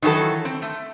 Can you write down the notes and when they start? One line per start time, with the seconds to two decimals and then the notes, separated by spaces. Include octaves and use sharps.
0.02 D#3 E3 F#3 F#4 A4
0.45 C4
0.62 A3